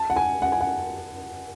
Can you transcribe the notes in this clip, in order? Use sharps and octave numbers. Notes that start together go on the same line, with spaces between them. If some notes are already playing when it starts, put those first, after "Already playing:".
Already playing: A5
F#5
G#5
F#5
G#5
F#5